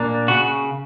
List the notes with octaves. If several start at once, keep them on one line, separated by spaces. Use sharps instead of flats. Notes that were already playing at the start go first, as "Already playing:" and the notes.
Already playing: A#2 A#3 D4
C#3 F#4